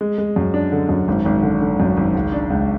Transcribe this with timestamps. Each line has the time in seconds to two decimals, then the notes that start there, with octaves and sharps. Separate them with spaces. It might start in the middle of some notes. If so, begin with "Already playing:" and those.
0.01 G#3
0.18 G#3
0.36 F#2
0.54 D4
0.72 D3
0.89 F#2
1.08 G#1
1.25 G#1
1.43 D3
1.62 D3
1.80 F#2
1.97 G#1
2.15 C#2
2.32 D4
2.50 C#2